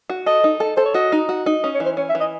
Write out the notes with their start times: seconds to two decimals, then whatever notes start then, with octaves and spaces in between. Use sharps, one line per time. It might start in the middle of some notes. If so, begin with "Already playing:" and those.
0.10 F#4
0.26 A4 D#5
0.44 D#4
0.60 A4
0.77 A4 C5
0.86 C#5
0.94 F#4 D#5
1.12 D#4
1.29 F#4
1.46 D#4
1.63 C#4 D#5
1.74 C#5
1.80 E3
1.86 C5
1.97 C#4 C#5
2.10 E5
2.15 E3
2.21 D#5